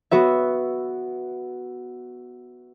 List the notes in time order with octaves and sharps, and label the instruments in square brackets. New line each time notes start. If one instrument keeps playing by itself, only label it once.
[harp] B3 F#4 B4 E5